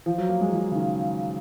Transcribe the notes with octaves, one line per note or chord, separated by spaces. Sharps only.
F3
F#3
A#3
G#3
F3
C#3
D#3